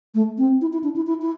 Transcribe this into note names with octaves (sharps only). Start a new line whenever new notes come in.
A3
C4
E4
E4
D4
E4
E4
E4